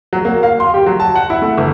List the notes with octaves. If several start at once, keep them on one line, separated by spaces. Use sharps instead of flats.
F#3
A#3
F5
C6
G4
F#3
A5
F#5
E4
A3
G1